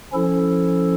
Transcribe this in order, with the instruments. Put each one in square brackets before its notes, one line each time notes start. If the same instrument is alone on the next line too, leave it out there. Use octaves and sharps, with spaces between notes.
[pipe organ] F3 C#4 E4 A4